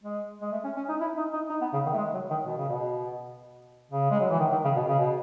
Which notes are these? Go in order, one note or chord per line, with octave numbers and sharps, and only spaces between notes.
G#3
G#3
A3
C#4
C#4
D#4
E4
D#4
D#4
D#4
B3
C#3
D#3
A3
G#3
F#3
D#3
B2
C#3
B2
C#3
G#3
F#3
E3
D#3
D#3
C#3
B2
C#3
B2